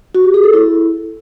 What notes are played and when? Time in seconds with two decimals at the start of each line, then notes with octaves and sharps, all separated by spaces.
0.15 F#4
0.24 G4
0.34 G#4
0.44 A4
0.53 E4